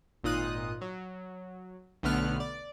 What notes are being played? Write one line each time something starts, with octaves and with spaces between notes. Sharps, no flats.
G#1 A#2 D#4 F4 D#6 F#6
F#3
B1 D3 A3 B3 F6 F#6
D5